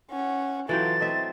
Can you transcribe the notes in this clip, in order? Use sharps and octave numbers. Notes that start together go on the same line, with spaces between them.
C#4 F#5
E3 F#3 F4 A4 G5 A6
A3 C4 D#5 E5